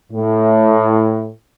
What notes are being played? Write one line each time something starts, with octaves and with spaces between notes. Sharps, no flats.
A2